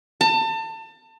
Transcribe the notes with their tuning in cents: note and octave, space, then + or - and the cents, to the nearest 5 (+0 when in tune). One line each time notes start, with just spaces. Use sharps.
A5 +30